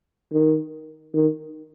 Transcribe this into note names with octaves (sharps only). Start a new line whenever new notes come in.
D#3
D#3